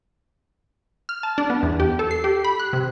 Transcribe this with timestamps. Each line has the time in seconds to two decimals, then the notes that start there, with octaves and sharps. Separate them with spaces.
1.09 F6
1.23 A5
1.38 D4
1.50 B3
1.63 E2
1.80 G4
1.99 A4
2.11 C7
2.24 G4
2.45 B5
2.60 F#6
2.73 C3